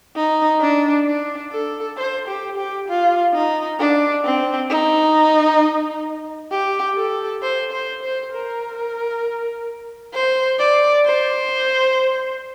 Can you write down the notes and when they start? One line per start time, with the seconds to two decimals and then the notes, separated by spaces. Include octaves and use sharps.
0.16 D#4
0.61 D4
1.07 D4
1.52 A4
1.97 C5
2.28 G4
2.58 G4
2.89 F4
3.34 D#4
3.79 D4
4.24 C4
4.70 D#4
6.51 G4
6.96 A4
7.42 C5
7.72 C5
8.03 C5
8.33 A#4
10.14 C5
10.59 D5
11.05 C5